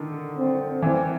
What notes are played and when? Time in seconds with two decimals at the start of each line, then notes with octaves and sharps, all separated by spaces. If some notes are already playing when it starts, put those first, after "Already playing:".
Already playing: D3 D#3
0.37 C4
0.82 E3 C4